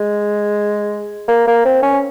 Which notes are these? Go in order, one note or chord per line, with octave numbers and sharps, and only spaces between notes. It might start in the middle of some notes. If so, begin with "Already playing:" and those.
Already playing: G#3
A#3
A#3
C4
C#4